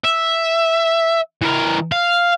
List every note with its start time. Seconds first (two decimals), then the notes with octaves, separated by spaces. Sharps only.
0.04 E5
1.42 E3 A#4
1.92 F5